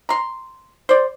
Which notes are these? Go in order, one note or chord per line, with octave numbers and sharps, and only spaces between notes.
A#5 C6
C5 D5